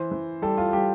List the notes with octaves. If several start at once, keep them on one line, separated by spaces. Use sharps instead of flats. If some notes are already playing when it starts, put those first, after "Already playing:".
Already playing: E3 C5
E3
G3 A4
F4
G3 G4